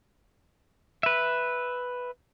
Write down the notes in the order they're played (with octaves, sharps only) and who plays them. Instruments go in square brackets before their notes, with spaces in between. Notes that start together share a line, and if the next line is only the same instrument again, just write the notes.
[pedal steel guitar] B4 E5